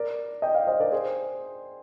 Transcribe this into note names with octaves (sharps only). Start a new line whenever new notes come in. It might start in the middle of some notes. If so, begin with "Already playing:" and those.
Already playing: A#4 D5
D#5 G5
D5 F5
C5 D#5
A#4 D5
G#4 C5